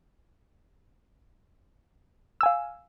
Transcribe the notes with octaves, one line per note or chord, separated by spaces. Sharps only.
F5 G#5 E6